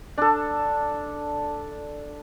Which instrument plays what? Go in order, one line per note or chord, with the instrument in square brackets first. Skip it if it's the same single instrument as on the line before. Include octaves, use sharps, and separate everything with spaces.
[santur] D4 A4